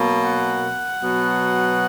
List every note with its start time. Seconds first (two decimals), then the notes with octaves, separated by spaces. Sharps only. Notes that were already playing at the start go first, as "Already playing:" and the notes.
Already playing: B2 F#3 A#3
0.24 F#5
1.03 B2 F#3 B3